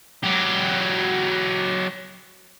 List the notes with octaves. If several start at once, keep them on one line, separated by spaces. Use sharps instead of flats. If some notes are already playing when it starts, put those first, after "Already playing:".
F#3 G4